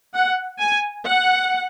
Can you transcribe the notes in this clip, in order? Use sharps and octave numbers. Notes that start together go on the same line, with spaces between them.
F#5
G#5
F#5